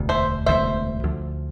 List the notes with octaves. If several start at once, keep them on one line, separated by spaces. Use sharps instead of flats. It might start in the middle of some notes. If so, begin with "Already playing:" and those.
Already playing: E1 D2 C3
C5 E5
E1 D2 C3 C5 E5
D2 D3 F3